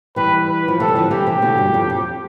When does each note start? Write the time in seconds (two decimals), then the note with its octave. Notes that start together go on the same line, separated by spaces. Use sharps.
0.16 E3 G3 B4
0.48 B4
0.68 F3
0.80 C3 E3 A4
0.88 G3
0.96 D3 F3
1.11 E3 G3 G4
1.26 C3 E3
1.42 B2 D3
1.58 G2
1.74 F2
1.90 F2